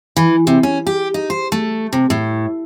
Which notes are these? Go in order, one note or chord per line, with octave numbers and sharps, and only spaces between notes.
E3
C3
C#4
G4
D#4
C5
A3
C3
A2